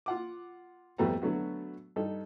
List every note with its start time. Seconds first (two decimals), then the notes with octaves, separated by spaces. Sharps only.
0.06 F4 F#5 D6
0.98 F2 G3 A3 B3 F#4 A#5
1.22 D3 F#3 A3 B3 F#4
1.96 G2 D#4 A4